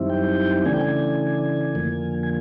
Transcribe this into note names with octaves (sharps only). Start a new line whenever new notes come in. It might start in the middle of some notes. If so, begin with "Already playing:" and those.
Already playing: F#2 D#3 G3 C4 E4
G5
C#3 E3 A3 D4 G#5
G5
G#5
F2 D3 F3 A#3
G#5